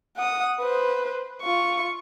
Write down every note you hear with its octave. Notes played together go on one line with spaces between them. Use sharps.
F#5 D#6
B4 C5
F4 C#6